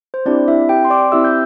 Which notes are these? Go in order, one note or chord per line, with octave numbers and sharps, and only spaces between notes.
C5
C4 D4 E4 G4 D5
E4 E5
G4 G5
C6
D5 D6
C4 E4 G4 E5 E6
G6